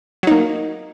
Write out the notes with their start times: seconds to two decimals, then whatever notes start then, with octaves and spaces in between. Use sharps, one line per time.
0.23 F#3
0.27 D#4
0.31 A#3